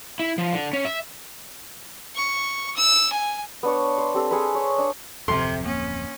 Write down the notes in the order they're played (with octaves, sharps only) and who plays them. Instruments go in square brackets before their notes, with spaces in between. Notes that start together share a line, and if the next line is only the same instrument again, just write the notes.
[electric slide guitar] E4
F3
D3
C#4
E5
[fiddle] C#6
E6
G#5
[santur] B3 D4 C#5
C5
C4 G4 A4 C5
G#4 C5 F#5 B5
C#5
D4
[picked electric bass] D1 F2 [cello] C3 [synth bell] A4 [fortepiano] C6
[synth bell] A#3 [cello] C#4